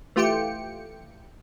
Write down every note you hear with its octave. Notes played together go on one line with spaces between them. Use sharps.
E3 A3 F4 G4 G5 C#7